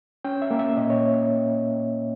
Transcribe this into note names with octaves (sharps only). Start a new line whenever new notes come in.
C#4 G5
E5
A#3
E5
A#2 D#5
C#5